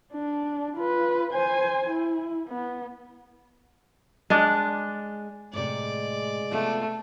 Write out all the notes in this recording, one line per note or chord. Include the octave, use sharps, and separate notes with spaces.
D4
F4 B4
C5 G#5
E4
B3
G#3 D4
A2 C3 G#3 D5
C3 A3 B3 F4